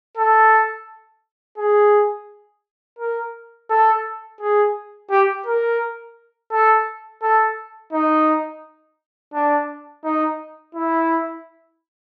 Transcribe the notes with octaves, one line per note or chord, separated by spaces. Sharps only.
A4
G#4
A#4
A4
G#4
G4
A#4
A4
A4
D#4
D4
D#4
E4